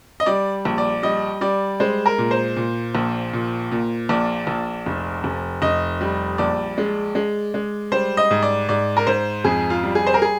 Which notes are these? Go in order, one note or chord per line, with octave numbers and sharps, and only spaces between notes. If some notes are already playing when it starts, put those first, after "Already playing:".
D#5
G3 D5
A#1
D5
G3 D#5
G3 D5
G#3 C5
A#4
A#2
C5
A#2
A#1
A#2
A#2
A#1 D5
A#1
F1
F1
F1 D#5
G3
A#1 D5
G#3
G#3
G#3
G3 C5
D#5
G#2
D5
G#2 D5
A#4
G#2 C5
F2 G#4
F4
G3
G#4
C5
A#4
G#4